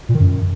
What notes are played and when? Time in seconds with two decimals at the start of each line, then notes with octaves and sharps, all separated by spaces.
0.09 A#2
0.14 D#3
0.20 F#2